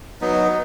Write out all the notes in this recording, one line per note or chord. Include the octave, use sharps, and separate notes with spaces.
F#3 B3 D#4